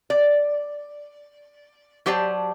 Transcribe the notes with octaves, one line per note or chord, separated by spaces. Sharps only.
D5
F#3 G4 C5 D5 A5